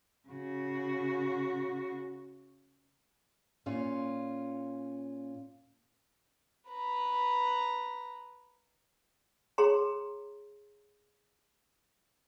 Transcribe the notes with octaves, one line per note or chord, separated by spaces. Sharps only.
C#3 F#4
A#2 C#4 F4
B4 A#5
G#4 C#5 A#5 C6